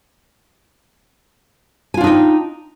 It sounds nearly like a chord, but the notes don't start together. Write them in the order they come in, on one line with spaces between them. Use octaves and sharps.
G#5 F4 D4 D#4 G5